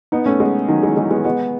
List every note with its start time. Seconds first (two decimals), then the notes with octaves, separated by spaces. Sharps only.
0.12 B3 D#4
0.26 A3 C#4
0.40 G#3 B3
0.68 D#3 F#3
0.83 E3 G#3
0.97 E3 G#3
1.11 G#3 B3
1.25 G#3 B3